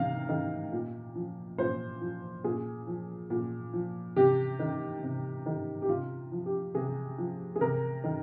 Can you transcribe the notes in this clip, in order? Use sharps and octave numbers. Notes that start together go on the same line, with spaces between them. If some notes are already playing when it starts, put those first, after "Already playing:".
Already playing: C3 D#3 F5
D#3
A#2
F3
A#2 C5
F3
A#2 G#4
F3
A#2
F3
C3 G4
D#3
C3
D#3
G4
C3 F4
F3
G4
C3 G#4
F3
G#4
C3 A#4
D#3